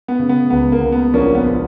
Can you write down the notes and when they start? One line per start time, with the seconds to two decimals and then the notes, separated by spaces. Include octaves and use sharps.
0.08 B3
0.19 C#3
0.29 B3
0.50 C#2 B3
0.72 A#3
0.82 C#2
0.92 B3
1.13 A#1 A#3 C#4
1.35 B3
1.45 A#2